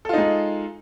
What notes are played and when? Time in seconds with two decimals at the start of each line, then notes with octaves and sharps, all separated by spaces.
0.05 A4
0.09 F4
0.14 D#4
0.18 G#3